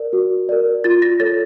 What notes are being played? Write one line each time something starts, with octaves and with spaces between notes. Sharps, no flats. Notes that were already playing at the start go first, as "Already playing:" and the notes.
Already playing: A#4 D5
F#4
A#4 D5
F4 A6
A#6
A4 C#5 A6